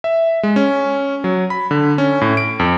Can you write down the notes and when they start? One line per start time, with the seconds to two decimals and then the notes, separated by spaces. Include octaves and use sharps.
0.04 E5
0.43 G#3
0.56 C#4
1.24 F#3
1.50 B5
1.71 D3
1.98 C#4
2.21 A2
2.37 D7
2.60 F2